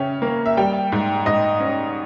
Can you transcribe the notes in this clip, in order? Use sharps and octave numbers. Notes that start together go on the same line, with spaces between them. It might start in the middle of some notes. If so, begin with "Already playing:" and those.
Already playing: C#3 C#4 E5 G5
A#3
E5
G3 G5
G#2
G#2 D#5
C#4